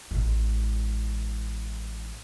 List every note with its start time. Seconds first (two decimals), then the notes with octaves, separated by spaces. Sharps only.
0.11 A1 G#3